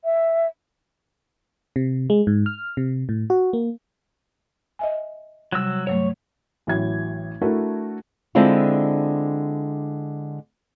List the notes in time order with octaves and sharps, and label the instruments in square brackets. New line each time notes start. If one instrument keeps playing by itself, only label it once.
[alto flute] E5
[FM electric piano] C3
G#3
G#2
F6
C3
A2
F#4
A#3
[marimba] D#5 E5 G#5
[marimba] C3 G3 F#6 [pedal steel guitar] F#3 E6
[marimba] G2 F#3 A3 [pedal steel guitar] C#5
[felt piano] A1 E3 F#3 G#6
A3 D4 E4 F#4 A4 A#4
[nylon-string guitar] D3 G#3 C4 D4 E4 F4